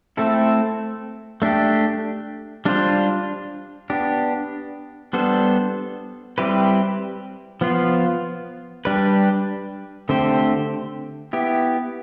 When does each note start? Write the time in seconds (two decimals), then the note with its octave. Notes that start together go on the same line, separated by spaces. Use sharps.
0.17 A3 C4 E4 A4
1.42 A3 D4 G4
2.65 G3 D4 F4 C5
3.90 B3 D4 G4
5.13 G3 B3 D4 A4 C5
6.38 G3 C4 E4 G4 B4
7.61 F3 B3 F4
8.85 G3 D4 G4 B4
10.09 D3 A3 C4 G4 C5
11.33 B3 E4 G4